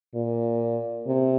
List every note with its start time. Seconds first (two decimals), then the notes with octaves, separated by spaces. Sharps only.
0.14 A#2
1.06 C3